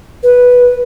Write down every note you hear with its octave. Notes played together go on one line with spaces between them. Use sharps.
B4